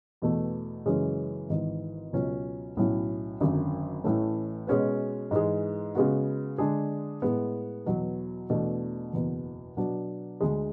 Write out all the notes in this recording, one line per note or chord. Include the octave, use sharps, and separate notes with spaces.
E2 B2 A3
F#2 C#3 E3 G#3 C#4
G#1 G#2 E3
C#2 B2 F#3 C#4
B1 A2 F#3 C#4 E4
G#1 F#2 D3 F#3
A1 A2 E3 A3 C#4
B2 G#3 C#4 F#4 B4
G#2 E3 G#3
C#3 G#3 B3 F#4
D3 G#3 D4 G#4
A2 G#3 B3
E2 B2 F#3
E2 B2 A3 D4
F#1 E2 B2
B2 F#3 B3 D4 F#4
D2 D3 G#3